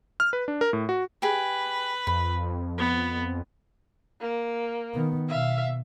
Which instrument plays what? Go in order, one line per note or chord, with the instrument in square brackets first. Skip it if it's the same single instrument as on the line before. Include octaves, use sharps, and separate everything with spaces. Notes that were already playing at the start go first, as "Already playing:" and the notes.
[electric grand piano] F6
B4
D4
A#4
A2
F#4
[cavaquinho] G4 G#4 [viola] B4
[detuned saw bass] F2 [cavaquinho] B5
[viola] B3
[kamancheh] A#3
[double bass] D#3 B3
[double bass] B2 [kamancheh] E5 F5